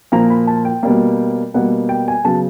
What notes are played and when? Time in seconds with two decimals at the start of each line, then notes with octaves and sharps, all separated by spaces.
0.12 A#2 F3 A#3 A#5
0.30 B5
0.47 A5
0.65 G5
0.83 B2 G3 A#3
1.54 B2 G3 A#3 F#5
1.89 G5
2.08 G#5
2.25 C#3 F#3 B3 A5